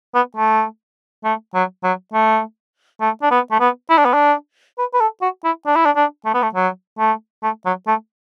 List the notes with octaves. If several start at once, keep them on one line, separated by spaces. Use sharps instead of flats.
B3
A3
A3
F#3
F#3
A3
A3
D4
B3
A3
B3
E4
D4
B3
D4
B4
B4
A4
F#4
E4
D4
E4
D4
D4
A3
B3
A3
F#3
A3
A3
F#3
A3